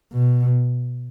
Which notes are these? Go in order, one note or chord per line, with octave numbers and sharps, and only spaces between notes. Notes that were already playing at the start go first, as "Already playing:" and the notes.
B2